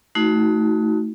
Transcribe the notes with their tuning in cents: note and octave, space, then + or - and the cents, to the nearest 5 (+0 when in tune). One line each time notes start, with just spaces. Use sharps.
A3 +0 D#4 +30 F#4 +0